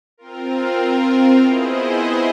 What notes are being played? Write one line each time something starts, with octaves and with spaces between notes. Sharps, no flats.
C4 F4 A#4
B3 E4 G#4 C5 D#5